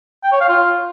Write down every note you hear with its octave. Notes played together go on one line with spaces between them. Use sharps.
G5
C#5
F5
F4